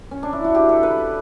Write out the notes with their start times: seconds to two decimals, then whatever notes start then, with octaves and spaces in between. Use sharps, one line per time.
0.11 C#4
0.23 D4
0.33 E4
0.44 F#4
0.55 G4
0.69 A4
0.83 B4